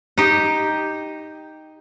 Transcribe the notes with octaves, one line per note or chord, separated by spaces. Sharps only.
D#4 G4